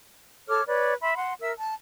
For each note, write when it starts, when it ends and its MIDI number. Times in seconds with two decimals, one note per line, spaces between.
0.48 0.63 69
0.48 0.63 73
0.48 0.63 86
0.48 0.63 89
0.67 0.94 71
0.67 0.94 73
0.67 0.94 74
1.01 1.15 76
1.01 1.15 83
1.01 1.15 84
1.16 1.33 78
1.16 1.33 84
1.41 1.52 70
1.41 1.52 76
1.41 1.52 88
1.58 1.74 81